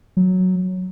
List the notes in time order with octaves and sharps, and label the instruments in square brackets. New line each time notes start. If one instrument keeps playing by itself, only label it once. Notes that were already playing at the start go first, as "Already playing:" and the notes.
[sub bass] F#3